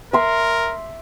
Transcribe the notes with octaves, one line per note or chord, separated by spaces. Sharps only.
A#4 E5 C6 D6